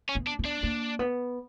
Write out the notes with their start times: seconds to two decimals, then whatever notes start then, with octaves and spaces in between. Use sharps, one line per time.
0.09 C#4
0.15 B3
0.27 D4
0.39 B3
0.45 D4
0.63 A#3
0.99 B3